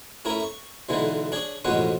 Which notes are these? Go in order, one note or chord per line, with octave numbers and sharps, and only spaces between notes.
A3 C#4 E4 A#4
C#6
B1 D3 E3 G#3
D4 G#4 C#5
A1 F2 B2 G#3 C#4 F#5